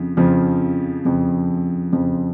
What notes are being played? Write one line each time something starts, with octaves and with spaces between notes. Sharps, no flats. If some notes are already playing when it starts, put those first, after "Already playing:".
Already playing: F2 C#3 F3
F2 C#3 F3
F2 C#3 F3
F2 C#3 F3